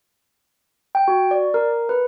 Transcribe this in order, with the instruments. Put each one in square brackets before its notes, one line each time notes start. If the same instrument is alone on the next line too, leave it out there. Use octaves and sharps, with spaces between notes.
[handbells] G5
F#4
D5
A#4
B4